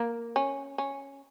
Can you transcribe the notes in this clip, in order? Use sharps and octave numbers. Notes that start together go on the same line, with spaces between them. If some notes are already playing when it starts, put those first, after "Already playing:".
Already playing: A#3
C#4
C#4